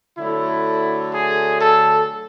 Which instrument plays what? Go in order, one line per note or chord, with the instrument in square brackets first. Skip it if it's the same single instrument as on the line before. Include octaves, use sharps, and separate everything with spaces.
[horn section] D3 F#3 A3 E4
G#4
A4